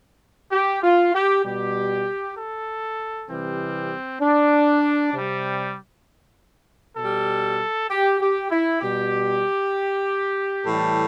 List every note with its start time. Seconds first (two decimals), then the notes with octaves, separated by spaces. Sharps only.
0.52 G4
0.83 F4
1.14 G4
1.44 B2 G3 G4
2.37 A4
3.29 C3 E3 G3 C4
4.21 D4
5.13 C3 G3
6.97 B2 G3 A4
7.90 G4
8.21 G4
8.51 E4
8.81 B2 G3 G4
10.65 A2 E3 G3 A4